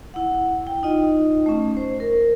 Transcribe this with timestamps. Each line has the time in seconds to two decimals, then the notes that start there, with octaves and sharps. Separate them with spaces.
0.14 E4 F#5
0.67 G5
0.83 D#4 F4 D#5
1.46 A3 C#4
1.77 C5
2.00 A#4